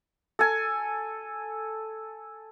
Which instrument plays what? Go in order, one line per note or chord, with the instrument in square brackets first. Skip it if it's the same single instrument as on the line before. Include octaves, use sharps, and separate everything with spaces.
[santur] A4 G#5